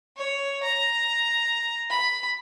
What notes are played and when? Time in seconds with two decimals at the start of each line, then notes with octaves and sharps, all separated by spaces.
0.17 C#5
0.63 A#5
1.90 B5